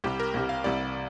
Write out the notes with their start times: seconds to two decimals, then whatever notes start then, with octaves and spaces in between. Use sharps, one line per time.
0.04 C2 C3 G3 G4
0.20 A#4
0.34 C2 C3 G3
0.49 F5
0.64 C2 C3 G3 D5